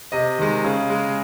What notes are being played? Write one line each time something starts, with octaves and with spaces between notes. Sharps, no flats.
C3 D#5
D#3 G#3
C#3
G#3